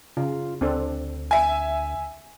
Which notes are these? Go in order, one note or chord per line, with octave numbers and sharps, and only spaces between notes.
C#3 F4
D2 C4 D4 A4
E5 G#5